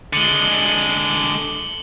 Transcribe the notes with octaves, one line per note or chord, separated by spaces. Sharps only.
D3 G#3 C#7 F#7 G7